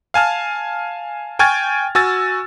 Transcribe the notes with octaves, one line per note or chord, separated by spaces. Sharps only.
F5 G#5 A5 F6
G5 G#5 C#6 F6 G#6 A6
F#4 G#5 E6 A6